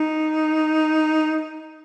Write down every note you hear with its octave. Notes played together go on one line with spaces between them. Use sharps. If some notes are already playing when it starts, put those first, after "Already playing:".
Already playing: D#4